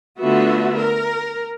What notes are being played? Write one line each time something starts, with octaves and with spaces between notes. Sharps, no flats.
D3 A3 B3 F4 F#4 E5
A#4